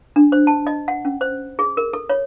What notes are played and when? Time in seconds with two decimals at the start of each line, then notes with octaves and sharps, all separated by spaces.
0.16 D4
0.32 C5
0.47 A5
0.67 D#5
0.88 F#5
1.05 C#4
1.21 C5
1.59 G#4
1.77 A#4
1.93 A4
2.09 C#5